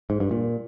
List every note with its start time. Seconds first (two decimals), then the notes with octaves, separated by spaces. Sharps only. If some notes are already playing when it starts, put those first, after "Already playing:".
0.10 G#2
0.20 G2
0.31 A#2